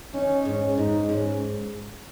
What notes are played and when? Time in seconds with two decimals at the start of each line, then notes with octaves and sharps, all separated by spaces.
0.13 C#4 D#4
0.45 G#2 C#4
0.77 G#2 D#4
1.09 G#2 C#4